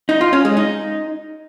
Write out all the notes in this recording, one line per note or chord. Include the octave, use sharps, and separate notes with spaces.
D#4
F4
C#4
G#3
D#4